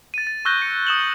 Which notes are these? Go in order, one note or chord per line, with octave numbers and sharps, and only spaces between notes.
A6 D#7
A6
C#6 E6 F#6 G6 A#6 G7
C#7
D#6 E7 F#7